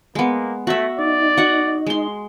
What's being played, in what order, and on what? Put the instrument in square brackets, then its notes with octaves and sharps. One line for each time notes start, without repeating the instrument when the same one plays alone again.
[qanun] G#3 B3 [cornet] A#3
[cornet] A3 [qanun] F#4 E5
[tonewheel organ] D#4 [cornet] D5
[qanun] F#4 F#5
G#3 C6